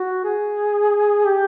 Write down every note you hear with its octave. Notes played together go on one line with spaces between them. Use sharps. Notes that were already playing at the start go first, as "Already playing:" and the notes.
Already playing: F#4
G#4
G4